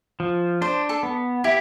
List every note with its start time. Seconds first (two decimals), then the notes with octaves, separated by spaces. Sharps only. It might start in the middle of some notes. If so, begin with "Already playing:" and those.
0.20 F3
0.61 D4 C5
0.89 A4
1.03 B3
1.44 E4 G4